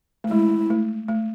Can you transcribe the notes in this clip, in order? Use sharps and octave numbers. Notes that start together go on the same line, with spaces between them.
A3
G#3 E4
A3
A3